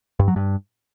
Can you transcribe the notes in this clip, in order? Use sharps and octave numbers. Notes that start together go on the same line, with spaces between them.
G2
F#3
G2